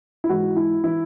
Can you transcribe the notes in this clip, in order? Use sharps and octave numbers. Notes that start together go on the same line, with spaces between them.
E4
G#2 E3 F#4
E4
E3 E4